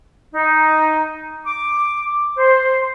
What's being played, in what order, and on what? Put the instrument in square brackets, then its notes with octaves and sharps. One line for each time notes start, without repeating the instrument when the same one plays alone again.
[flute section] D#4
D6
C5